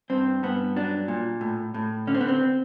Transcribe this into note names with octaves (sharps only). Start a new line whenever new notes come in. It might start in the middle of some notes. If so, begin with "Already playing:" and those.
G2 C4
G2 B3
F#3 D4
A#2
A2
A2
D3 C#4
C4
B3
C4